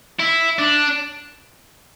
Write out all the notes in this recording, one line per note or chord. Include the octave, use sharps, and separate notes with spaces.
E4
D4